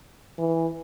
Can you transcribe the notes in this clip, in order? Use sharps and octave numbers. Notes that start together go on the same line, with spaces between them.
E3